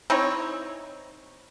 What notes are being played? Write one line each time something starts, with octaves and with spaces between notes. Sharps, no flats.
C4 D#4 E4 C#5